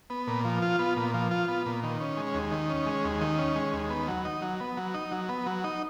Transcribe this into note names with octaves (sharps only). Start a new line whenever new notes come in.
B3
A#2
F3
F4
B3
A#2
F3
F4
B3
A#2
D#3
C#4
G#3
D#2
D#3
C#4
G#3
D#2
D#3
C#4
G#3
D#2
B3
F#3
D#4
F#3
B3
F#3
D#4
F#3
B3
F#3
D#4